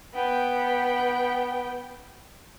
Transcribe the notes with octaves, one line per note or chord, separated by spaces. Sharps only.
B3 G5